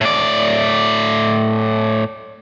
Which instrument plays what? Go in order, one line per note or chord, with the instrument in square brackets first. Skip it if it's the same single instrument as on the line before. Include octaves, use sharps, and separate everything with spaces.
[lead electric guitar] A2 D5